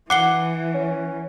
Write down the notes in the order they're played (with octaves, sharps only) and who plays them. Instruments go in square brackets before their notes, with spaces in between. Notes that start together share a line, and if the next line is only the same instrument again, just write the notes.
[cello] E3 [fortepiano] F#5 [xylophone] D6 C7 G7
[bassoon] C#4